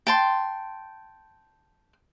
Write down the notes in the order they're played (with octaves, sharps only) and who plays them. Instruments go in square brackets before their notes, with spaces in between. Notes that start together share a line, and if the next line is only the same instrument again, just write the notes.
[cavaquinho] G5 A5 C6